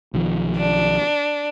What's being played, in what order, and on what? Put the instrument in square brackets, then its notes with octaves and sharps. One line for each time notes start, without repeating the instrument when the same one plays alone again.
[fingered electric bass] B1 D#3 F3
[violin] D4